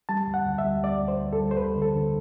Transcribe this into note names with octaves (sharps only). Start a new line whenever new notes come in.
G3 A5
D2
F#5
D2
E5
G3
G3 D5
D2
C5
D2
A4
G3
C5
D2 B4
D3
A4
D3